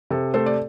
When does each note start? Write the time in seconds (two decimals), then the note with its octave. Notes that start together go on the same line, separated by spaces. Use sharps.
0.11 C3 A4
0.34 A3 A4 C5
0.46 D5